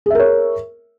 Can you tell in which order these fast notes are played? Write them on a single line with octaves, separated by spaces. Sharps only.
G#4 E5 A#4 C#5